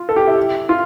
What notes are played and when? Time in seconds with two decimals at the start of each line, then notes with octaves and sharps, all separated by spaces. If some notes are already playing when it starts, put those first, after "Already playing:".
Already playing: F4
0.09 A4
0.16 G4
0.27 E4
0.69 F4